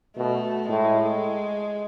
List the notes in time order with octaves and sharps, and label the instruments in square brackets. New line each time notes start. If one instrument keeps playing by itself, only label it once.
[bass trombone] B2 [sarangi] A3
[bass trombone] A2 [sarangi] G#3